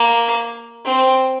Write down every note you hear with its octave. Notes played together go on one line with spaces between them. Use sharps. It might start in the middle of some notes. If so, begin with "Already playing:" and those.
Already playing: A#3
C4